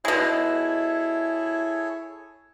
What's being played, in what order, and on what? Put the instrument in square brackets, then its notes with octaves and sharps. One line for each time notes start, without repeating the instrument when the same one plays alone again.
[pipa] B2 G#3 [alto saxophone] E4 [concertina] G#4 A4 C#5